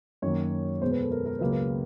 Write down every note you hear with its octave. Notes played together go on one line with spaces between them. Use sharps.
F#2 D#3 F#3 A#3 C#5
E2 B2 G#3 C5
B4
A4
A#4
A#4
C#2 C#3 F#3 A#3 B4
A#4